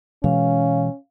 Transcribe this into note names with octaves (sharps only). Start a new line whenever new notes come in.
B2 E3 G#3 C#4 F5